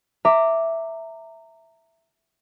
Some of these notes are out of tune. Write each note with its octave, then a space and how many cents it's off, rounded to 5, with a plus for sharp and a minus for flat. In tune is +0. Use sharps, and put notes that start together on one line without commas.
E5 +0 A#5 -25 D6 +0